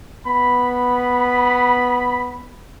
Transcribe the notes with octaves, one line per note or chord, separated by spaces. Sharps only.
B3 B5